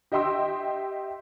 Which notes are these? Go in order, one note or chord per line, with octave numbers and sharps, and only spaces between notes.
G4 D#5 E5 G5 C6 E6